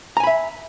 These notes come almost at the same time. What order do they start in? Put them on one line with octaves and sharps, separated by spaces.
A#5 G#5 B5 E5